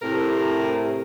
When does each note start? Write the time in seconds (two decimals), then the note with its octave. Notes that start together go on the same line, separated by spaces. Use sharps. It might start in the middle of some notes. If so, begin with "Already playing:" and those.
0.01 A2 C3 A#4